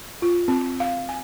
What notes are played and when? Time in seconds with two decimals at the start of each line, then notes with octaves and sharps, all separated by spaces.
0.22 F4
0.48 C4
0.80 F5
1.09 G#5